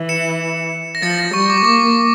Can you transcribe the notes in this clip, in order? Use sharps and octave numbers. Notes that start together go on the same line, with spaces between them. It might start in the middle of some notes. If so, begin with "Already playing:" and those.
Already playing: E3
C#7 E7
A#6
F3 A6 C#7
A#6
G3 C#6
D6
C#6
A#3 D6